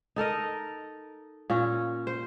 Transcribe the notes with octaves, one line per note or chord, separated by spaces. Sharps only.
D#4 A4 A#4 D#5
A#2 C#4
C5